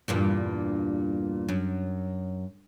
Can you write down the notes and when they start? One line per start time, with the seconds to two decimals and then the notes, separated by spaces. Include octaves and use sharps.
0.08 E2 G2 A#2
1.49 F#2